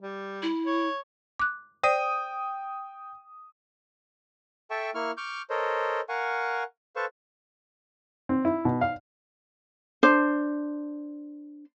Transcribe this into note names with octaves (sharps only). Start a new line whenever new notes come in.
G3
E4
C#5
D6 F#6
C5 D5 G5 D#6 D#7
A4 E5 G5 A5 C#6
A#3 E4 C#6 F6
C#6 D6 F6 G6
A4 A#4 C5 C#5 D#5
A#4 F5 F#5 G#5 C#6
A4 B4 C5 F5 A5 C#6
C4
E4
B2
F5
D4 C5